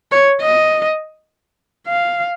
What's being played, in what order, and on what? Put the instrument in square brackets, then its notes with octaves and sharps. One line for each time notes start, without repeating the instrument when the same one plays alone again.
[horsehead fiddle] C#5
D#5
F5